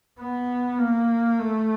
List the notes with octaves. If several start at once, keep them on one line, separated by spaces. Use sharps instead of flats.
B3
A#3
A3